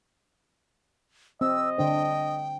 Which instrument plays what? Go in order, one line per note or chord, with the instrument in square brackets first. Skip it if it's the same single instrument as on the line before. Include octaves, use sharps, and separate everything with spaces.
[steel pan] C4 [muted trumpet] D#5 [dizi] E6
[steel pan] D3 D4 C5 [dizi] G5